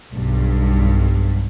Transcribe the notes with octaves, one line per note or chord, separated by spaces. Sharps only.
B1 G2